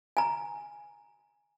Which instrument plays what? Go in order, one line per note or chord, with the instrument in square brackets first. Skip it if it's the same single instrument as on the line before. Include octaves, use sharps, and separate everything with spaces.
[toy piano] G#5 A#5